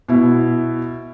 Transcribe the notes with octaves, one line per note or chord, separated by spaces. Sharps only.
B2 E4